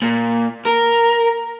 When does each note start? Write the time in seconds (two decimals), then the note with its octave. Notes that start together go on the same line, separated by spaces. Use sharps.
0.02 A#2
0.66 A#4